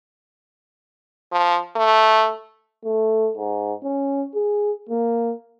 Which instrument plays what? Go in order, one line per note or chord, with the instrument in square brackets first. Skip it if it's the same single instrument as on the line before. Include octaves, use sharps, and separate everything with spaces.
[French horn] F3
A3
[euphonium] A3
G#2
C#4
G#4
A#3